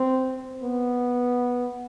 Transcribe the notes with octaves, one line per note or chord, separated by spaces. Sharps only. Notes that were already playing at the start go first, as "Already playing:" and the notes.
Already playing: C4
B3